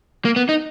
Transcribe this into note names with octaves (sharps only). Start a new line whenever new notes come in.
A#3
B3
D#4